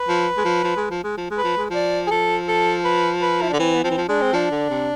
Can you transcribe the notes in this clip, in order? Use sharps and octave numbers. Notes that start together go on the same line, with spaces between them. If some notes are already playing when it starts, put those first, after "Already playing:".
Already playing: B4
F3
G#3
F3
F3
G#3
F3
G#3
F3
G#3
B4
F3
G#3
F3 D5
G#4
F3 A4
A4
B4
B4
E4
D3 D4
E3 C4
B3
F3 C4
E3
F3
G#3 D4
C4
F3 D4
D3
C3